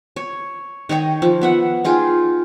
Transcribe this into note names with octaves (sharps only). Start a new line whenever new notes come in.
C#5
D#3 C#5 D#5 G5
F3
B3 E5 F#5
D#4 F4 G#4 G5